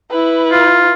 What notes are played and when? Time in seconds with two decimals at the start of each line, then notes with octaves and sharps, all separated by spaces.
0.10 E4 B4
0.51 F4